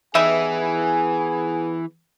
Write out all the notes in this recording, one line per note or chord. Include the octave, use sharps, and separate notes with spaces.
E3 G3 B3 D#4 G#4 E5 G#5